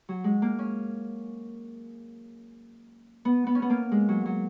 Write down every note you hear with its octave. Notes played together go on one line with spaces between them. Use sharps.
F#3
G#3
A#3
C#4
B3
B3
C#4
B3
A#3
G#3
F#3
F#3